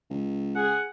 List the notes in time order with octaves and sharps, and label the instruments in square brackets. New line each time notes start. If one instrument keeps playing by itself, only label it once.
[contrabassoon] C#2
[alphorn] G#4 [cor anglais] F#5